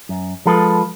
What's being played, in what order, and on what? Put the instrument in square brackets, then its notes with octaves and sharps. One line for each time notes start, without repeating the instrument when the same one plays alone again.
[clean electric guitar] F#2
F3 G#3 F4 A4 B4